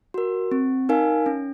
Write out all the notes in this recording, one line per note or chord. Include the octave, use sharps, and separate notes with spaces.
F#4 A#4
C4
D#4 A#4 F5 G#5
C#4